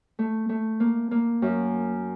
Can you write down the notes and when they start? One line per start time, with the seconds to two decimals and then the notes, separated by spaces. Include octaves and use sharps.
0.19 A3
0.49 A3
0.80 A#3
1.11 A#3
1.42 F#2